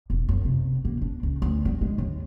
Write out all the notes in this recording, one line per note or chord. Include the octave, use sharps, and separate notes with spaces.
E1
F#2
C3
A#3
D4
C#2
D2
G3
G#3
D#2